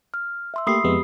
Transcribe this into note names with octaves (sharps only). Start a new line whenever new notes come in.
F6
E5 C6 E6
A3 A#3 G4 B5 D#6 C7
F2 G#3 B3 G4